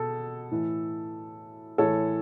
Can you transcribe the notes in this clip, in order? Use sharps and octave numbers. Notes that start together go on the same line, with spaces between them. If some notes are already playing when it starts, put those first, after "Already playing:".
Already playing: B2 A4
A2 E3
A2 E3 A4 C#5